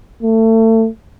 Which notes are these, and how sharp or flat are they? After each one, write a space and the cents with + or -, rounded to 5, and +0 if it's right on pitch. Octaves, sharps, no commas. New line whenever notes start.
A3 +30